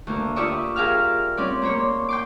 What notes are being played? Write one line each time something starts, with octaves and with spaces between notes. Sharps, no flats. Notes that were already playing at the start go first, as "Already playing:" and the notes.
D2 A#3
F4 G4 D5 E5 C#6 D#6
G4 G#4 A#4 E5 F5 F6
C4 C#4 D5
A#3 C5 C#5
G5 C6 D6